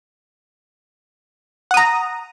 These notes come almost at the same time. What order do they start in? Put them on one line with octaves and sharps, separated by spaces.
F#5 D#6 A#5